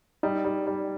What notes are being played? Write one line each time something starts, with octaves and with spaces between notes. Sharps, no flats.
G3 D#4
G3
G3